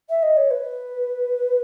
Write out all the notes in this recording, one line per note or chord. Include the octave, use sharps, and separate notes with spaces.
E5
D#5
C#5
B4